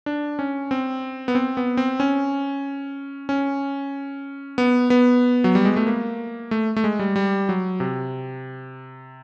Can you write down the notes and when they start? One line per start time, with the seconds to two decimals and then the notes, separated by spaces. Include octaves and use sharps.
0.06 D4
0.39 C#4
0.71 C4
1.28 B3
1.35 C4
1.57 B3
1.77 C4
2.00 C#4
3.29 C#4
4.58 B3
4.90 B3
5.44 F#3
5.55 G3
5.65 G#3
5.76 A3
5.87 A#3
6.51 A3
6.76 A3
6.84 G#3
6.99 G3
7.16 G3
7.49 F#3
7.80 C3